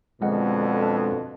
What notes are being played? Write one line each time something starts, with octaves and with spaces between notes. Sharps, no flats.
F2 B2 D3 G#3 D#5 F#5